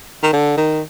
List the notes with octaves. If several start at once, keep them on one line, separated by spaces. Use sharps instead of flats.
D#3
D3
D#3